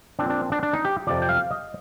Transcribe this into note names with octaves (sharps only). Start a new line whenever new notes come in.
A#2 F3 C4 D4
D4
D4
D4
D#4
G4
F2 C3 F3 D5
G5
F5
D#5